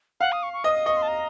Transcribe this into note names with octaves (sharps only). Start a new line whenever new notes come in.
F5 F#5
D#6
C#6
C#6
D#5 D#6
D#6
D#5 C#6
C6
A5
A#5